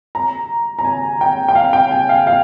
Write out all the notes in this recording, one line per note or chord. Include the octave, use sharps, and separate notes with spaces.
A#5
A#5
G#5
G5
G5
F5
G5
G#5
F5
F5